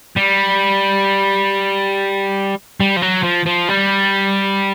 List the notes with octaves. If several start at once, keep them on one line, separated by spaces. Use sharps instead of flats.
G3
G3
F3
F#3
F3
F3
G3